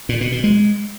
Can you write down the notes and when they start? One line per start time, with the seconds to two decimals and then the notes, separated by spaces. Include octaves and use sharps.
0.09 A#2
0.21 B2
0.32 B2
0.44 G#3